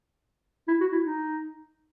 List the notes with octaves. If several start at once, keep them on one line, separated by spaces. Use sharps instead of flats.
E4
F#4
E4
D#4